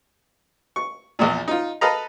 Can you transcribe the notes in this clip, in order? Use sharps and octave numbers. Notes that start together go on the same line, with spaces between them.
C#6
A#1 E2 A#2
D#4 F4
A4 B4 D#5 F5 A#5